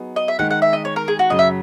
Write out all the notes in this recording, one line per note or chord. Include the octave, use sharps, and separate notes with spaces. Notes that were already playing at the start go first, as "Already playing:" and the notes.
Already playing: F#3 B3 D#4 G#4
D#5
E5
D#3 G#3 D#4 F#5
F#5
E5
D#5
C#5
A#4
G#4
F#4
F#2 C#3 F#3 D#5
E5